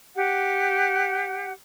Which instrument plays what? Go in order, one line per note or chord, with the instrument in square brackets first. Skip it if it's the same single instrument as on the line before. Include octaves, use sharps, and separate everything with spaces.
[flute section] G4 F#5